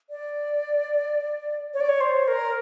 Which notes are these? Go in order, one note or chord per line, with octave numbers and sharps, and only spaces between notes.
D5
C#5
D5
C#5
C5
A#4